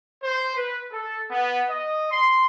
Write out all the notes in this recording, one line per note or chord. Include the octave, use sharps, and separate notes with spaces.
C5
B4
A4
B3
D#5
C6